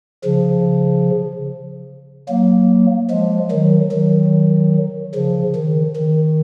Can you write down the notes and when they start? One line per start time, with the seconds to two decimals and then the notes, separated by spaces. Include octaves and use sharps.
0.24 C#3 F3
2.29 F#3 A#3
3.10 F3 G#3
3.51 D#3 F#3
3.92 D#3 F#3
5.15 C#3 F3
5.56 D#3
5.97 D#3